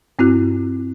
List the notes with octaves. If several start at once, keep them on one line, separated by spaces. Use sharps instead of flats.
G2 C4 E4 F#4 F#6